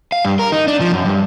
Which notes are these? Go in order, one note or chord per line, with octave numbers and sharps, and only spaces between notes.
F5
G2
A#4
D#4
D4
F3
F#2
G2